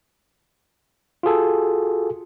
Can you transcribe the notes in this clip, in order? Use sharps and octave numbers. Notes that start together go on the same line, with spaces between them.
F4 F#4 G#4 A4